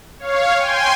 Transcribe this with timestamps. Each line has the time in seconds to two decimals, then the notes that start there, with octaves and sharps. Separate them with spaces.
0.19 C#5 F5
0.57 G5 G#5 C6